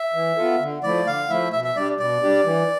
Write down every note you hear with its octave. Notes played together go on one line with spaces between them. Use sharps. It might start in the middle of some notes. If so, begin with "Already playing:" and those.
Already playing: E5
E3
B3 F4 A4
D3
F3 A3 E4 D5
D3 F5
F3 A3 E4 E5
B2 E5
E5
G3 D4 G4 D5
B2 D5
G3 D4 G4
E3